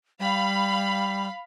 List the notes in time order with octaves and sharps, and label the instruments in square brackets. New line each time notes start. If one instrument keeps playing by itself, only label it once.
[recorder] G3 [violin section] F5 B5